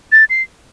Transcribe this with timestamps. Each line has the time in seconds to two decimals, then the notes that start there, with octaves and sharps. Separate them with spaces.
0.12 A6
0.30 C7